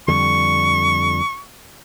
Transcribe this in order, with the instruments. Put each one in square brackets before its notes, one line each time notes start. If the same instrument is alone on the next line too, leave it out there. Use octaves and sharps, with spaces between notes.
[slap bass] F2 D3 G3 [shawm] C#6